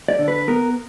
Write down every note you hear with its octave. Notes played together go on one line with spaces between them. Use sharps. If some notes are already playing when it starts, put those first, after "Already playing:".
D5
D3
B4
B3 A#4